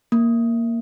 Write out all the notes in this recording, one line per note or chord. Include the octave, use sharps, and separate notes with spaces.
A#3